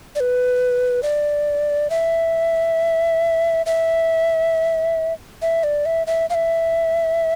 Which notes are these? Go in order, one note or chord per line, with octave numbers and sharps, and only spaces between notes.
D5
B4
D5
E5
E5
E5
D5
E5
E5
F5
E5